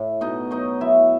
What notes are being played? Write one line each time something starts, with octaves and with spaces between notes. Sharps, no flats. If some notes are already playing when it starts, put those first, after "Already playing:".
Already playing: A2 E4
B2 D#4 D#5
F#3 D#4 D#5
F#3 E4 E5